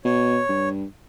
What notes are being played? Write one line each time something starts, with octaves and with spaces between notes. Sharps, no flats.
B2 C#5
G2